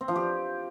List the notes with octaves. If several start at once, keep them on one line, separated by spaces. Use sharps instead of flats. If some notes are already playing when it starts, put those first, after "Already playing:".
C4
F3
G4